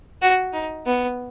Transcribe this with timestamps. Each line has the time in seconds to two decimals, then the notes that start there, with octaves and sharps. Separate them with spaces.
0.22 F#4
0.53 D#4
0.86 B3